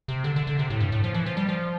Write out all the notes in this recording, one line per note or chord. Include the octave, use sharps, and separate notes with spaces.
C3
D3
D3
D3
C3
A2
G2
A2
F3
E3
F3
G3
F3